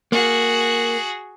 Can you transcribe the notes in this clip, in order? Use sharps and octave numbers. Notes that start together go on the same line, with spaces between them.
A#3 F#4 G#4